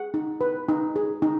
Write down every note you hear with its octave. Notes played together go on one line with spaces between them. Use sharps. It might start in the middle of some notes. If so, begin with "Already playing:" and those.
Already playing: G#4 F#5
D#4
B4
D#4
G#4
D#4